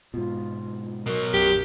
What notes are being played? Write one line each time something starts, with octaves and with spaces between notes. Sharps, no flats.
G#2 B2 F4
B2 F#3 A#4
B1 F#2 G4